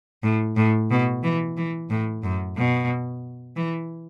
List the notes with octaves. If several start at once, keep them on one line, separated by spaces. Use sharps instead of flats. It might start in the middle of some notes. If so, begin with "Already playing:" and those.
A2
A2
B2
E3
E3
A2
F#2
B2
E3